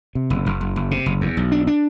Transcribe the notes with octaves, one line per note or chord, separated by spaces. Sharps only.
C3
F#1
F#1
F#1
F#1
C3
F#1
E2
B1
D4
D4